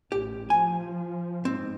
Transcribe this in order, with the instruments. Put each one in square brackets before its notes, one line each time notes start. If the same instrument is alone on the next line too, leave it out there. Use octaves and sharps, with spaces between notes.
[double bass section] A1 [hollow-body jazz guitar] G4
[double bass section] F3 [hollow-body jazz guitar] G#5
[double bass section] G#2 [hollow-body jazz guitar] C4